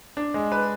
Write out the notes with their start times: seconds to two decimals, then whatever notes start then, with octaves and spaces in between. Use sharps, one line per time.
0.17 D4
0.34 G#3
0.52 B4